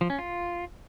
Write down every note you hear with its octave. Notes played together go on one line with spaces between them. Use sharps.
F3
C#4
F4